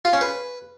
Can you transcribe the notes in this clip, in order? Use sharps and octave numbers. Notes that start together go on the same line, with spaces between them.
F4
C#4
B4